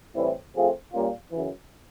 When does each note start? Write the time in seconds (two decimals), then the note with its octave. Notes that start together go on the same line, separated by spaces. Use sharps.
0.14 A2 E3 G3 C4 E4
0.54 F3 A3 C4 F4 G#4
0.92 A#2 G3 A#3 C#4 F4
1.32 F#2 C#3 E3